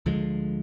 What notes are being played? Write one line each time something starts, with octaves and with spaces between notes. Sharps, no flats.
D2 D3 F3 G#3